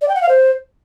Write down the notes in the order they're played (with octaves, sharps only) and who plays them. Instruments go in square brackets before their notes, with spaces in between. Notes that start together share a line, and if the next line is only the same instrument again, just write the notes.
[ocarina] D5
G5
F#5
F5
C5